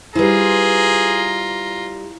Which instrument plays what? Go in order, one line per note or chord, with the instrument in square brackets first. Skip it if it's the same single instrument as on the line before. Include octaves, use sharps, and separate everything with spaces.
[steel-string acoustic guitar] G3 C5 [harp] E4 B4 [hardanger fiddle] F4 A#5 [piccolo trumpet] G#4